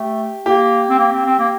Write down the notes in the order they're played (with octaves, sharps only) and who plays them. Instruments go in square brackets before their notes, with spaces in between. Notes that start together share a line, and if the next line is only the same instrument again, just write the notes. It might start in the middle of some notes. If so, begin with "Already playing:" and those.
Already playing: [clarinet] A3 [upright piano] G4
[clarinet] A#3 [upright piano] G4
[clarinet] C4
A#3
C4
C4
A#3